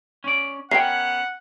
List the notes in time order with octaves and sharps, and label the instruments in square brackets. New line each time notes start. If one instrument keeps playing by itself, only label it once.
[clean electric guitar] C#4 D5
[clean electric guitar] B3 C#4 A#4 [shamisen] E5 G5 [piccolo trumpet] F#5 [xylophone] C7